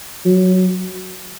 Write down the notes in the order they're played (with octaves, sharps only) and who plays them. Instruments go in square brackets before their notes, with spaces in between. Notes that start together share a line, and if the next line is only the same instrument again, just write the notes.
[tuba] F#3